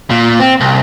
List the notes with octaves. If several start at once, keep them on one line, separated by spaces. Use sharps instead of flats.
A#2
C4
C2